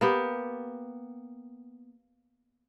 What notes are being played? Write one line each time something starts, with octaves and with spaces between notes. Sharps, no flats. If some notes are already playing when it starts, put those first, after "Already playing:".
A#3 B3 G4